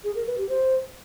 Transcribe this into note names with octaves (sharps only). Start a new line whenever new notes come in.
G#4
A#4
B4
G4
C5